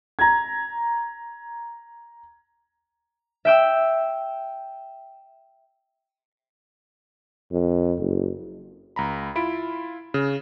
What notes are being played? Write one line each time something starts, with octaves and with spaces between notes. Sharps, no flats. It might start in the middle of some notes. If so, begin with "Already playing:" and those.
A#5 G#6
E5 G5 E6
F2
F#1
C#2 A#5 B5
E4 F4 B5 D7
C#3